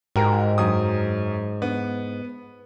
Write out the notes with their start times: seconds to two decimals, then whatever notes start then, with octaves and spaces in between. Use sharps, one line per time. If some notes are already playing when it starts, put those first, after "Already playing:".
0.16 G#2 F#4 G4 A#4
0.58 F#2 D#6
1.62 B3